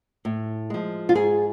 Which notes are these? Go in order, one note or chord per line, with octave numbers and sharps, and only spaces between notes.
A2
F3 G#3
F4
G#2 G#4